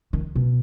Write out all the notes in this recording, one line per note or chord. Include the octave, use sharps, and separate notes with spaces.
D#3
B2